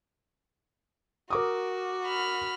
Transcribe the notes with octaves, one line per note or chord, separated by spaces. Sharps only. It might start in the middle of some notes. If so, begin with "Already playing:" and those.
F#4 A#4 D6 D#6
B5 F6